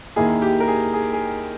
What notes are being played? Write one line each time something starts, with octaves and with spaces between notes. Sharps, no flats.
D#2 D#3 A#3 E4 G#4
G4
A#4
G#4
G#4
G#4